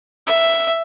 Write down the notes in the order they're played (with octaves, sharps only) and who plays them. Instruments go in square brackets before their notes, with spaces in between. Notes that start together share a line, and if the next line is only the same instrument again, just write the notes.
[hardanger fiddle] E5